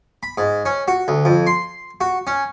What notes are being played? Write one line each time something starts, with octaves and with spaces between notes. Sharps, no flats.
B5
G#2
C#4
F#4
D2
F2
C6
F#4
C#4